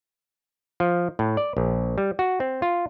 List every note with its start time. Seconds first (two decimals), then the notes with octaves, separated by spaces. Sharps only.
0.80 F3
1.19 A2
1.37 D5
1.57 A#1
1.98 G3
2.19 F#4
2.40 C4
2.62 F4